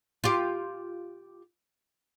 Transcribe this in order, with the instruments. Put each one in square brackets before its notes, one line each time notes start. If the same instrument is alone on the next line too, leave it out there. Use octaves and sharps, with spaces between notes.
[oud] F4 G4